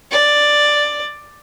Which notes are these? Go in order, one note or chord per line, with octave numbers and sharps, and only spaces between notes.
D5